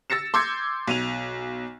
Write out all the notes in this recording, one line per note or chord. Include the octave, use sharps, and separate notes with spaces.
E6 A6 A#6 C#7 E7
C6 D6 E6 G6 G#6 C#7
B1 D#7 F7